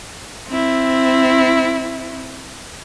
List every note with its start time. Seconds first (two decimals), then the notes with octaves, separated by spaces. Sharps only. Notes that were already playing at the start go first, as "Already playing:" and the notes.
0.48 C4 E4